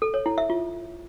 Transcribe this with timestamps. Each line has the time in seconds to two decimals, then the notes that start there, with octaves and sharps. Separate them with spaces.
0.02 A4
0.14 C#5
0.26 E4
0.38 E5
0.50 F4